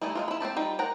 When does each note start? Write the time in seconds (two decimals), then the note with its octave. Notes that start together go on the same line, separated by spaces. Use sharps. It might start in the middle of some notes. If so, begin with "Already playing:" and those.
0.02 G3 A3 D#4 E4 G#5
0.15 G#3 A#3 F4
0.28 E4 B5
0.40 C4 F#4 G4 A5
0.56 G3 D#4 F4 G5
0.79 A#4 F#5 G5 A#5